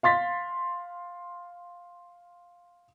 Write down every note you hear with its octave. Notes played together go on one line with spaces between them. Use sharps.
F5 C6 A6 B6